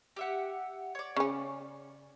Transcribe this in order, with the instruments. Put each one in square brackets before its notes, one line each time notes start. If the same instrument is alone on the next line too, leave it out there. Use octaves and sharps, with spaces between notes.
[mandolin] G4 E5 F#5
C#5 D5
[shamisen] C#3 C#4